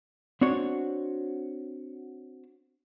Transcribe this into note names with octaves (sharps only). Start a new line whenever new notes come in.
C4 D4 F#4 C#5